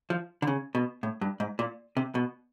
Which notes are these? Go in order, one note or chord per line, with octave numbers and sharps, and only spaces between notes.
F3
D3
C#3
B2
A2
G2
G#2
A#2
C3
B2